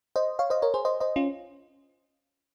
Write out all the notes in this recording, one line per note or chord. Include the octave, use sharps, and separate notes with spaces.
C5 D#5
C#5 F5
C5 D#5
A#4 C#5
G#4 C5
C5 D#5
C5 D#5
C#4 F4